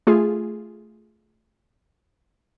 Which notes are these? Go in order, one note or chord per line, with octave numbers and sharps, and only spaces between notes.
A3 F4 G#4